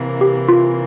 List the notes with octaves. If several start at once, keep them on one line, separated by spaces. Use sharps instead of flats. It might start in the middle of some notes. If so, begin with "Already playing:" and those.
Already playing: C3 E3 A#3
G4
F4